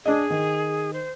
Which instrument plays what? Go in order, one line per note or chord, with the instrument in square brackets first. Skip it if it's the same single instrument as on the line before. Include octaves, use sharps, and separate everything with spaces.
[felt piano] D4 D#5 [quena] G#4
[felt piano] D#3
[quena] C5